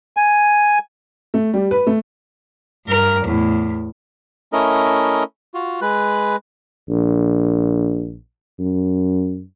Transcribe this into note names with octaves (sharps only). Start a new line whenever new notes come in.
G#5
A3
G3
B4
A3
G2 A#4
E2 A2
A3 C#4 E4 A#4 D#5
F4 F#4
G#3 B4 F#6
A#1
F#2